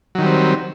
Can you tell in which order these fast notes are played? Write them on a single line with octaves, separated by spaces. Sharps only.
F#3 D#3 G3 C4